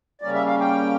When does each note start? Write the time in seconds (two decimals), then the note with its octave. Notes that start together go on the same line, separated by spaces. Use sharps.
0.21 C#3 G3 A#3 C#4 D5
0.34 E5
0.47 F5
0.60 G5